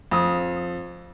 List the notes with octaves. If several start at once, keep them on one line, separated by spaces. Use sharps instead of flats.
F2 D#6